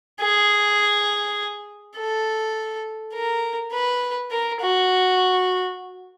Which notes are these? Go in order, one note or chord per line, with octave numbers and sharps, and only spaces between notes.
G#4
A4
A#4
B4
A#4
F#4